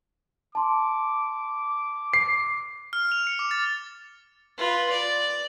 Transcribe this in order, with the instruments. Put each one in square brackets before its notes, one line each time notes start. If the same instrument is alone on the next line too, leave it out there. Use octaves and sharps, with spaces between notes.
[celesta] A5 C6 [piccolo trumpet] D6
[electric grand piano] C7
[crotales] F6
F7
C#7
D6
A6
[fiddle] F4 B4
D5